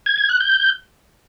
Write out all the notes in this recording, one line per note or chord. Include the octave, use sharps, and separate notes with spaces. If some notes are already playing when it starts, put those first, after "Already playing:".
G#6
G#6
F#6
G6